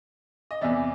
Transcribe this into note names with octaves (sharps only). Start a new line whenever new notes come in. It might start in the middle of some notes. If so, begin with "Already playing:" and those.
D#5
E2 C3 E3 D5 E5